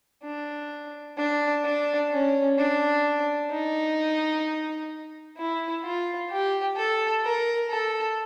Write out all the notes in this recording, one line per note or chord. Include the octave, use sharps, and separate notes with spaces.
D4
D4
D4
C#4
D4
D#4
E4
F4
G4
A4
A#4
A4